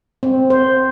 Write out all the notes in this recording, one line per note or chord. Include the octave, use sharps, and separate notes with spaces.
C4
C5